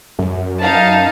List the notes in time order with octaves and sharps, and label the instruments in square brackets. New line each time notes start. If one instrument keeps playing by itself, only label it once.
[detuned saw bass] F#2
[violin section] D#4 F5 A5